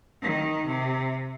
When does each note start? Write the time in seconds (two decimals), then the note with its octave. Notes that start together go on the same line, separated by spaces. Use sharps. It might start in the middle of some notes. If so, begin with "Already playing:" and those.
0.22 D#3
0.66 C3